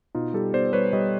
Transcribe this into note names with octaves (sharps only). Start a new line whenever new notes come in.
B2 D#4 F4
G3 G4 A4
B3 C5 D5
G3 B4 C#5
G3 C#5 D#5